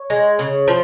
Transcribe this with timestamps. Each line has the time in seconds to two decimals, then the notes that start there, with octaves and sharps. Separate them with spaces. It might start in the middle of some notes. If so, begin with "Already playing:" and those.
Already playing: C#5
0.10 G#3
0.39 C#3
0.68 F3